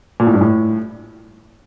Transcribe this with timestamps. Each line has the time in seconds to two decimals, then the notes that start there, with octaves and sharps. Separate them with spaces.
0.20 A#2
0.27 A2
0.34 G2
0.41 A2